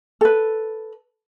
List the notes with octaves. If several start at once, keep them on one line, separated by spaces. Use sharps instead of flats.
A4 B4